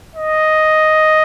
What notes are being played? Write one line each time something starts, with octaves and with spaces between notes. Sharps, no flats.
D#5